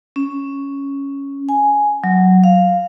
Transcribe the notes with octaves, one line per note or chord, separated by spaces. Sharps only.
C#4
G#5
F#3
F5